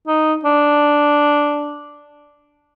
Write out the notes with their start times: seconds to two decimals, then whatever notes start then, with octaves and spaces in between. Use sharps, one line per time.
0.07 D#4
0.45 D4